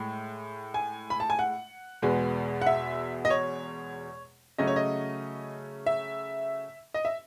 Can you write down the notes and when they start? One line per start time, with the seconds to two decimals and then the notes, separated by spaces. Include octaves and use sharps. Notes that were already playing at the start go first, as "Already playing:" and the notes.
Already playing: A2 G#3
0.74 G#5
1.10 B5
1.20 A5
1.30 G#5
1.39 F#5
2.02 E2 B2 G#3 B3
2.62 F#5
2.66 E5
3.25 D#5
3.30 C#5
4.58 C#3 F#3 A3 C#4 D#5
4.67 C#5
4.76 D#5
5.86 E5
6.94 D#5
7.05 E5